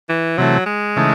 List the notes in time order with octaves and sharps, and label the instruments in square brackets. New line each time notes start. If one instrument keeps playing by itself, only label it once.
[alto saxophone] E3
[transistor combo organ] C3 E3 A3 [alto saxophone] F#3
[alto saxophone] G#3
[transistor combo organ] C#3 E3 A3 D#4